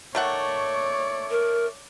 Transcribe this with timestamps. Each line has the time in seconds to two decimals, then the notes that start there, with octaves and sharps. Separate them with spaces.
0.15 D#3 A3 C#5 D5 F#5
1.30 A#4